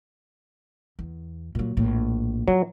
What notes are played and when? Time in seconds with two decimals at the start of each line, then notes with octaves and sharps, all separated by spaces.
0.99 E2
1.55 A#2 F#3
1.77 A#1 A2
2.48 F3 F#3